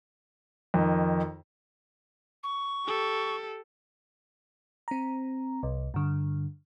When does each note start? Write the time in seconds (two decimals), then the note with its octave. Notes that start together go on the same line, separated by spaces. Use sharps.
0.74 F2 D#3
2.43 C#6
2.86 G4 A4
4.88 C4 A#5
5.63 C2
5.94 G2 D3